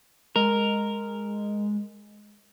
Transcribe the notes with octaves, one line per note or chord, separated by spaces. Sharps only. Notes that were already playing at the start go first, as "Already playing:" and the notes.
G#3 A#4